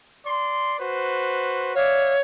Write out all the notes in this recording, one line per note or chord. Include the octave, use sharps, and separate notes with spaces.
D5 C6
F#4 B4 C5
C#5 D5 E5 F5